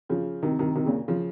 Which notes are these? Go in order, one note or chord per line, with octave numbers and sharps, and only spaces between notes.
C#3 F3
C3 D#3
C3 D#3
C3 D#3
A#2 C#3
C#3 F3